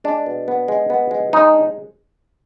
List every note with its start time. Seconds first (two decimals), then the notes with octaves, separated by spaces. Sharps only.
0.04 G#3 D4
0.26 B2
0.48 B3
0.68 G#3
0.90 B3
1.11 G#3
1.33 G#3 D#4
1.54 D4